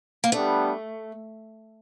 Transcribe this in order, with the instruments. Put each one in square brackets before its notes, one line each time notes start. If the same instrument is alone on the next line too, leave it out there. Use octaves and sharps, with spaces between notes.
[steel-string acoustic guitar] A#3
[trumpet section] G3 B3 D4 [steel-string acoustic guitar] A3